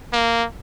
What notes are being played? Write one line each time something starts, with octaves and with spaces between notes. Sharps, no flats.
A#3